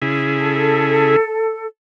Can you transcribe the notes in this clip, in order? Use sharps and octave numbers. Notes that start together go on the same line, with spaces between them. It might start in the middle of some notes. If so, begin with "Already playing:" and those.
C#3 E4 G#4
A4